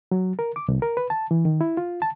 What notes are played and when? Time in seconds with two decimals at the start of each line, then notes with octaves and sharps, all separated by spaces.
0.11 F#3
0.39 A#4
0.56 D6
0.68 C2
0.82 A#4
0.97 B4
1.10 A5
1.31 E3
1.45 D#3
1.61 E4
1.77 F4
2.02 A5